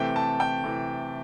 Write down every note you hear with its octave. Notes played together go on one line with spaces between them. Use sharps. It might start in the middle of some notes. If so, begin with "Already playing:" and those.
Already playing: C3 E3 A3 G5
A5
G5
C3 E3 A3